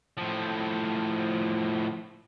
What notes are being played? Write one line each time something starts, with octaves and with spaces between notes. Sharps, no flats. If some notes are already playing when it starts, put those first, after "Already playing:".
A2 F3